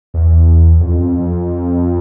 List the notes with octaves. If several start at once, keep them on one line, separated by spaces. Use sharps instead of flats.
E2
F2
F2
F2